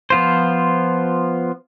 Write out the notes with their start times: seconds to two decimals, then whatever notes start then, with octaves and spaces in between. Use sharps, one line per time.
0.10 F3 B3 F4 C5